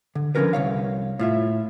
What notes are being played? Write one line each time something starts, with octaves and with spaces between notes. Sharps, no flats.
D3
D3 F3 C#4 F#4 A#4 B4
C2 C#5 F5
A2 F4 E5